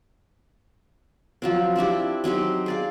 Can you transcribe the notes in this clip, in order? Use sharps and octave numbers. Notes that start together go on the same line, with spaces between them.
F3 F#3 C4
C4 D4 E4 G4
F#3 C4 D#4 G4
G#4 D5 F5